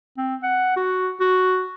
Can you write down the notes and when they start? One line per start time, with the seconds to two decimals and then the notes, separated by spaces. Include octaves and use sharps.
0.17 C4
0.43 F#5
0.76 F#4
1.20 F#4